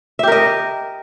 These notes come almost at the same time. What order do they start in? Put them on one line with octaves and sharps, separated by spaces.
E5 G4 A#4 D#5